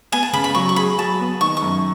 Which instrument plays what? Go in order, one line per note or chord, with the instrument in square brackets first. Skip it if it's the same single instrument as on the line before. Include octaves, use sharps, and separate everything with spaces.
[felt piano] B3 [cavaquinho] G#5
[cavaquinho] A5
[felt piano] C#3 [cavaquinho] B5
[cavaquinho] B5
[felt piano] F#3 [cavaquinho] C#6
[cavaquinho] C#6
[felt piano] G#4 [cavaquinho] B5
[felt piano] F#3 [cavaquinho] A5
[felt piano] B3
[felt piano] D#3 [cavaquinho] C#6
[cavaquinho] C#6
[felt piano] F#2